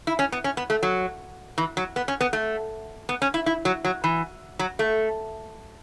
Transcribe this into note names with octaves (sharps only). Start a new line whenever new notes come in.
E4
C#4
B3
C#4
B3
A3
F#3
E3
F#3
B3
C#4
B3
A3
B3
C#4
E4
E4
F#3
F#3
E3
F#3
A3